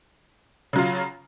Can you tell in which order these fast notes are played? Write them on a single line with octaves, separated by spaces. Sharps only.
C#3 F#3 F4